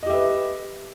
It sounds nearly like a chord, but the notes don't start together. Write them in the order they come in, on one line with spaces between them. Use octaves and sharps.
D#5 G4 E5 B4